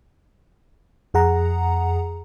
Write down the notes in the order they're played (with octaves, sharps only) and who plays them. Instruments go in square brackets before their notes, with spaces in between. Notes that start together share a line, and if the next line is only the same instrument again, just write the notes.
[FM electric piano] F2 G#4 F#5 A#5